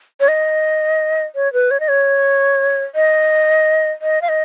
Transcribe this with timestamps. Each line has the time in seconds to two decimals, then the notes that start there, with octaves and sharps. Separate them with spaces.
0.20 C#5
0.28 D#5
1.35 C#5
1.53 B4
1.71 C#5
1.80 D#5
1.88 C#5
2.95 D#5
4.02 D#5
4.22 F5
4.29 D#5